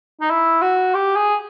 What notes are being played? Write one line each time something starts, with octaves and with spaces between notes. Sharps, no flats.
D#4
E4
F#4
G4
G#4